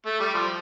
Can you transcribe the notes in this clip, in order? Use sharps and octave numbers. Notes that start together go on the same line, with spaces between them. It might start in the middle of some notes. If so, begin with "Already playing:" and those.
A3
G3
F3